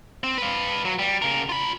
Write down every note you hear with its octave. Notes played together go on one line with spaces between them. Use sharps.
C4
B4 F5
F#3
G3
C#3 A#4
F4 B5